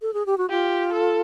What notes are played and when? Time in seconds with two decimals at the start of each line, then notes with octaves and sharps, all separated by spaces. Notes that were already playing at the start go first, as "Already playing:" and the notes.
0.02 A4
0.14 G#4
0.26 G4
0.38 F#4
0.49 F4 G4
0.92 A4